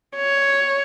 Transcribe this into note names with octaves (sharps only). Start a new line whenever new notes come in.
C#5